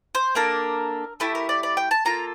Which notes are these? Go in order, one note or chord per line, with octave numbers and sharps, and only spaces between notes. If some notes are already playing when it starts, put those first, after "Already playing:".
C5
A#3 D4 A4 A#4
A3 E4 G4 A4
A#4
D5
D5
G5
A5
A#3 F4 A4 A#5